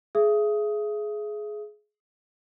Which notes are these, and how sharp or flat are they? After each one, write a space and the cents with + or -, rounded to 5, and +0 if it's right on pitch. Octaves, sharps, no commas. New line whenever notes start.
G#4 +20 E5 +30 D#6 +15